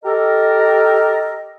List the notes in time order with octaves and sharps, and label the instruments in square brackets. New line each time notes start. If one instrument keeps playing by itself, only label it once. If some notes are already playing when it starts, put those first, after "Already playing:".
[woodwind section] G4 A4 A#4 D#5